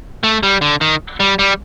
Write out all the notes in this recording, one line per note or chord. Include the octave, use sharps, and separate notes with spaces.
A3
G3
D3
D#3
G3
G3